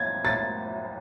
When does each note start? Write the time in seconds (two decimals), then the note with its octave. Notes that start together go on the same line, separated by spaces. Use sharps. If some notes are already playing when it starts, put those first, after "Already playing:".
Already playing: G#6 A6
0.25 A6